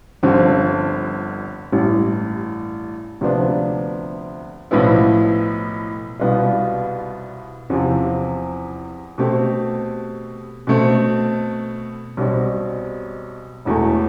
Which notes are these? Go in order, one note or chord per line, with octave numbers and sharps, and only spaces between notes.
G1 G2 D3 F3 C4
A1 G2 E3
D2 C3 F3 B3 D4
B1 A2 F3 B3 E4
C2 B2 G3 B3 F4
E2 C3 F3 C4
B2 A3 C4 G4
B2 A3 C4
B1 B2 G3 C4
E1 E2 B2 A3